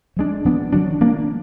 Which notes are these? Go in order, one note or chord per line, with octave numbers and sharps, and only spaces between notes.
F3 G#3 D4
F3 B3 D4
D#3 F#3 D4
F3 A#3 D4